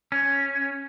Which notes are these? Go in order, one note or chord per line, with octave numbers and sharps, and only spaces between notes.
C#4